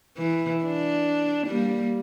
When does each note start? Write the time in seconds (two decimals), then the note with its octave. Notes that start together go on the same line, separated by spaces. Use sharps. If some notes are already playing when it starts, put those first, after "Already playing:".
0.18 E3
0.64 D4
1.47 G3 A#3